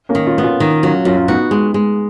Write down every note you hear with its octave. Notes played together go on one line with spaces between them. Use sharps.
A#3 C#4
D#3
C#4 F4
B3
C#4 F4
D#3
F#3 C#4 F4
F#2 C#4 F4
F4
B3 D#4 F#4
G#3
G#3